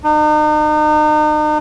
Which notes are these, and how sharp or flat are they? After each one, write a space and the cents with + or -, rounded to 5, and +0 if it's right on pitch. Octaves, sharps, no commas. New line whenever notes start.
D#4 -40